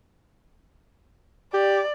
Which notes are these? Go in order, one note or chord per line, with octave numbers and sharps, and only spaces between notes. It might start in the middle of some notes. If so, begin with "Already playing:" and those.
G4 D5